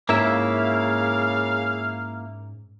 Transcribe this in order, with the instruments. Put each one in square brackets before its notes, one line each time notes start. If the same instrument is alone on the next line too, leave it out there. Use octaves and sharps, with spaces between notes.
[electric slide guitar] G#2 C#4 [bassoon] C#3 [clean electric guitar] A#3 E4 E5 [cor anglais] F5